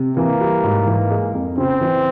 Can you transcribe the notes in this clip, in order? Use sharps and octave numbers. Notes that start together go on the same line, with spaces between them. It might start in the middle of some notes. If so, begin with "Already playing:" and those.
Already playing: C3
E3 A#3
G3
G#2
E3
G#3
F2
C#3 C4
E3